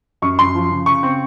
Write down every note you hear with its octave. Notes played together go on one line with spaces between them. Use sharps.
F#2 C#6
F#2 C6
F3
C#3
C#3 C#6
C4